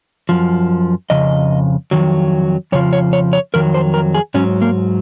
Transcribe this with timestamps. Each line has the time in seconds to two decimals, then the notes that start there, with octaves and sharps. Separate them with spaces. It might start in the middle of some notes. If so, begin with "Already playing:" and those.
0.29 F#2 F3
1.10 F2 C#3 D#5
1.91 F2 D#3 F#3
2.72 F2 C#3 F3 C#5
2.93 C#5
3.13 C#5
3.33 C#5
3.54 F2 D#3 F#3 A#4
3.74 C5
3.94 A#4
4.14 G#4
4.34 G#2 F#3 C#4
4.61 A#3